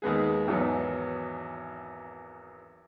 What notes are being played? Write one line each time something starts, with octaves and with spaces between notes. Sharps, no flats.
D#2 G#3 B3 G#4
G#1 E2 F#3 B3